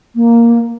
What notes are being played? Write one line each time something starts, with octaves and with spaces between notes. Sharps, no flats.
A#3